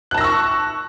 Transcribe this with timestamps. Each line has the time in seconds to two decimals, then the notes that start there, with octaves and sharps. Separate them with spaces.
0.11 F#6
0.14 A5
0.18 A#6
0.21 E6
0.24 C#6